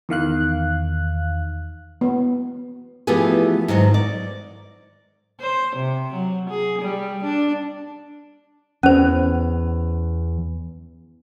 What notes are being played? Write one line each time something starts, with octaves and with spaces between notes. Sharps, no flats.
E2 D#3 F5 F#6
B3
E3 F3 A3 B3 G4 G#4
G#2 D#3 F#3 F#4
D5
C5
C3
F#3
G#4
G3
D4
E2 C#4 C5